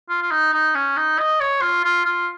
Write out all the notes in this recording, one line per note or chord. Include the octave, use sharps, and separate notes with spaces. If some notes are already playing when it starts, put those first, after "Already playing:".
F4
F4
D#4
D#4
C#4
D#4
D#5
C#5
F4
F4
F4